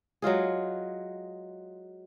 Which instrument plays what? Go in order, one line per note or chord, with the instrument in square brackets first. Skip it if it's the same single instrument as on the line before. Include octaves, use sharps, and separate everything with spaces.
[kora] F#3 G#3 F4 G#4